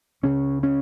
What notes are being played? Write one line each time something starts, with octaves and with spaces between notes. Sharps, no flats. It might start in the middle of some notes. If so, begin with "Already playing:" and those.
C#2 C#3 C#4
C#4